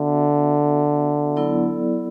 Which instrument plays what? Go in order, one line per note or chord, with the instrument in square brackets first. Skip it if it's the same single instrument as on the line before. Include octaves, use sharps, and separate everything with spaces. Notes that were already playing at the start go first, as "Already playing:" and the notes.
Already playing: [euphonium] D3 [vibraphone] B3 F#4 A4 E5
[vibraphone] F#3 B3 E4 A4 D5